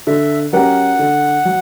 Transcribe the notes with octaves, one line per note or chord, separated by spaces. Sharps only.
D3 E5
F#3 C#4 G4 A#4 F#5
D3
F#3